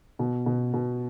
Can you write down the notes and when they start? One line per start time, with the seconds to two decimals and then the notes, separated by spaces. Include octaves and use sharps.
0.19 B2
0.46 B2
0.73 B2